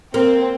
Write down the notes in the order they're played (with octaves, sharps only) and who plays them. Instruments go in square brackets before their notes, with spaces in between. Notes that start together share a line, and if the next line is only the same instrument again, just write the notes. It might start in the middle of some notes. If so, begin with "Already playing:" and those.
[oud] A#3 [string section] C4